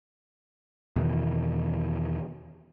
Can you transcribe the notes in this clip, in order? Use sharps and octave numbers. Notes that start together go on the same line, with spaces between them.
E2 B2 D#3 E3